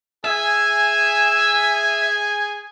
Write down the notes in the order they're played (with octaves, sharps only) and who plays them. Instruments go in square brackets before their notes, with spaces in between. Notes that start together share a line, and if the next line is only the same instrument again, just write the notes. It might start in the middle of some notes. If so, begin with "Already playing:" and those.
[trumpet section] G#4 G#5 [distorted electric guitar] E5